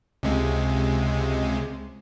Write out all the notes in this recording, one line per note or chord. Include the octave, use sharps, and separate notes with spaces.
C#2 C3 G#3